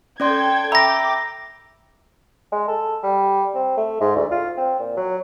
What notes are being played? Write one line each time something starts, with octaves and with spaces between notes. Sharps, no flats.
C#4 A4 D5 G5 C6 G#6
E5 G5 A#5 B5 D6 E6 A#6
G#3
A4
G3
C4
A3
G#2
D2
F4
C4
A#2
F#3